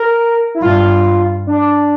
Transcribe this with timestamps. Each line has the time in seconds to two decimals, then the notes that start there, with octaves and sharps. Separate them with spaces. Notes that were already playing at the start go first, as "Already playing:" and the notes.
Already playing: A#4
0.55 E4
0.62 G2 F4
1.47 D4